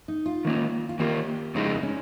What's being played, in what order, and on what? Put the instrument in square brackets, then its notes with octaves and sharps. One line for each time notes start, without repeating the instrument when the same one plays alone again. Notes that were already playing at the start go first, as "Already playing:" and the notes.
[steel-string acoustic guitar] D#4
F4
[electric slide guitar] D#3 A#3 C#4
[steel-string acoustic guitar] F4
[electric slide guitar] D#3 A#3 F4 A#4 [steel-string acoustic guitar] G4
[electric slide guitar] F2 C#3 G#3 [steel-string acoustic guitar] D#4
[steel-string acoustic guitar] D#4
C#4